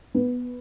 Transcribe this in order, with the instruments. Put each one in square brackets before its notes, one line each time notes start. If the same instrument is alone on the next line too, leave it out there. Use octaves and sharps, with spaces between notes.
[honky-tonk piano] B3